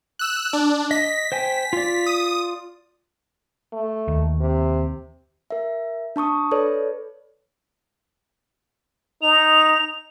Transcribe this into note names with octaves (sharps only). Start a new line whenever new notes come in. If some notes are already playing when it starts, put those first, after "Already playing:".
E6 F#6
D4
D#5 B6
C5 G5 G#5
F4 D5
D#6
A3
D#2
C3
A#4 E5
D4 A5 C#6 D#6
A4 B4 C#5 D5
D#4 F7